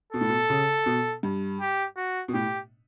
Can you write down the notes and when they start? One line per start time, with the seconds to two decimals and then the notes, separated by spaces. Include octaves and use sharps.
0.13 B2 A4
0.21 A2
0.29 B2
0.50 C#3
0.86 B2
1.23 G2
1.60 G4
1.97 F#4
2.28 B2
2.34 A2 G4